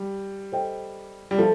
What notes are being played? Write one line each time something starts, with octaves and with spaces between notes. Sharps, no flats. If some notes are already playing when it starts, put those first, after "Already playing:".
Already playing: G3
A4 C5 D#5 G5
G3
F3 A4